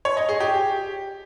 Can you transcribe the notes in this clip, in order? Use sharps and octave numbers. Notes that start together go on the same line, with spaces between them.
C#5
D#5
G#4
G4